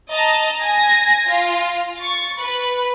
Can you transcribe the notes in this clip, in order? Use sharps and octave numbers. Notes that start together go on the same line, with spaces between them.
D#5 A5 A#5 A6
G#5 A#6
F4
C#6 A6
B4